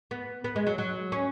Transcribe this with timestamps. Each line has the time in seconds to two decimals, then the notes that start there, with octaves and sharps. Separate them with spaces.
0.11 B3
0.44 B3
0.56 G#3
0.67 F#3
0.78 F#3
1.12 C#4